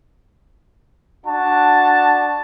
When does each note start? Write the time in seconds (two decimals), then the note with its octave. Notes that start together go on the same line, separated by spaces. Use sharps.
1.27 D4 F#4 A5